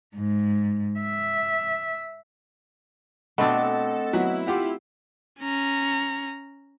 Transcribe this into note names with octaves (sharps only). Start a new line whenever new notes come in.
G#2
E5
B2 A3 C4 D4 A4 D#5 F#5 B5
F#3 B3 E4
F4 G4 F#5
C#4 A#5